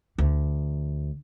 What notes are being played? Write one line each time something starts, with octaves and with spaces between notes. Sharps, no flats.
D2